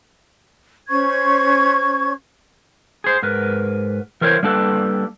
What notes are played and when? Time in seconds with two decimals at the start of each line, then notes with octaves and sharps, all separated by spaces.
0.89 C#4 C5 C#6 G#6
3.04 G#4 C5
3.22 G#2 A#4 B4
4.21 E3 A#4 C5 C#5
4.43 G3 A#3 D4 A4 B4